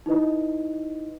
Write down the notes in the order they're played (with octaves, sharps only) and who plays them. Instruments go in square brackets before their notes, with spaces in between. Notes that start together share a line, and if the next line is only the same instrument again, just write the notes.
[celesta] D#4 E4 B4 D#5